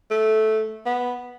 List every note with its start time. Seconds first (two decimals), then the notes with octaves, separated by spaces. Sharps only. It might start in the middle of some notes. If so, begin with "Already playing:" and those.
0.11 A3
0.86 B3